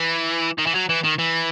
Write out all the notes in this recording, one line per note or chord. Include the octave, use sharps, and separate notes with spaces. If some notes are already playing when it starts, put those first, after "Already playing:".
Already playing: E3
D#3
E3
F#3
E3
D#3
E3